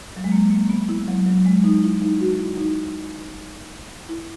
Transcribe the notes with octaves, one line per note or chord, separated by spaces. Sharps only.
F#3
G#3
A#3
A#3
B3
E4
F#3
F#3
G#3
D#4
E4
D#4
F#4
E4
D#4
E4